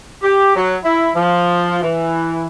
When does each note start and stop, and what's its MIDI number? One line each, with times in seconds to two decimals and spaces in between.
0.23 0.55 67
0.56 0.77 54
0.84 1.10 64
1.15 1.80 53
1.82 2.46 52